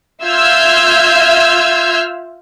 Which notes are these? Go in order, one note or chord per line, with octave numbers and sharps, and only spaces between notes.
F4 E5 E6 F6 G6 G#6